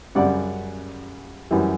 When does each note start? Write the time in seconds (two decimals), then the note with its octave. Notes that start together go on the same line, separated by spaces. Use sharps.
0.15 F#2 C#3 G3 D5 F#5
1.51 F#2 E3 G3